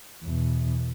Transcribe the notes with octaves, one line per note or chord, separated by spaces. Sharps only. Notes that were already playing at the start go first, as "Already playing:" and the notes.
E2 B2